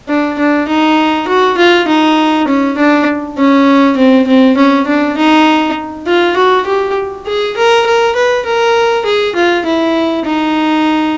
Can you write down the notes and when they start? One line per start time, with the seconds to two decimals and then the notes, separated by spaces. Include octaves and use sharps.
0.08 D4
0.39 D4
0.68 D#4
1.27 F#4
1.57 F4
1.88 D#4
2.48 C#4
2.77 D4
3.37 C#4
3.97 C4
4.27 C4
4.57 C#4
4.87 D4
5.17 D#4
6.07 F4
6.36 F#4
6.66 G4
7.26 G#4
7.57 A#4
7.86 A#4
8.15 B4
8.45 A#4
9.05 G#4
9.35 F4
9.65 E4
10.25 D#4